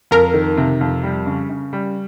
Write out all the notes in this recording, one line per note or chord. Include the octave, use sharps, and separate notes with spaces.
F2 A#4
D#3
C3
F2
G3
C#3
C#3
G3